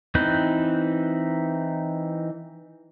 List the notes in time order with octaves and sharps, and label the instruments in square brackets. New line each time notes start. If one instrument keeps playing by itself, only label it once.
[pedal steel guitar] E3 C4 D#4 B4 G6